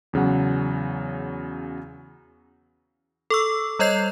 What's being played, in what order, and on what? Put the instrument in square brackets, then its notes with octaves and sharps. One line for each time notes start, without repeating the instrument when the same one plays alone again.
[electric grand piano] E2 C#3 F#3 F#5
[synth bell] A4 C#6 E6
G3 C#5 D#5 G6 C7 F7